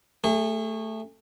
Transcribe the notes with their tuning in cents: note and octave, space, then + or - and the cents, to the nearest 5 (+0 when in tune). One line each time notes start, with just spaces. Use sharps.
A3 +5 G#4 -35